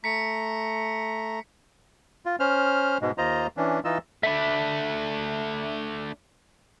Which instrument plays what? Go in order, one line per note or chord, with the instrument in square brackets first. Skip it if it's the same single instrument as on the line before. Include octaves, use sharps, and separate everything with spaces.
[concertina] A3 A#5 [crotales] B6 C#7
[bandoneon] F4
C#4 C5 F6
G#2 B2 G#3
D#2 F4 C5 D#5 A#5
E3 C#4 D4
E3 D#4 F4 D#5 E6
[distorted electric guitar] A3 D4 [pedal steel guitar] E5 B5